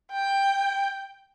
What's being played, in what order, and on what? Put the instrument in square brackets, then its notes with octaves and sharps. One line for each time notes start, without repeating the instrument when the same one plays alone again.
[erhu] G5